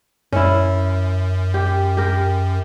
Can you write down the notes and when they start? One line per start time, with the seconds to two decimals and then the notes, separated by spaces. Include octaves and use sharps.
0.33 F#2 C#4 E4
1.54 G4
1.97 G4 A#4